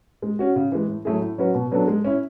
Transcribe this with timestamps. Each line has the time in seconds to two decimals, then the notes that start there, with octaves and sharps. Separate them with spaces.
0.22 G#3
0.39 C#4 F#4
0.56 C#3
0.72 E3 G#3
0.88 A2
1.05 F#3 A3 E4 G#4
1.22 A2
1.38 F#3 C#4 F#4 B4
1.55 B2
1.71 F#3 B3 D4 A4
1.88 G#3
2.04 C#4 E4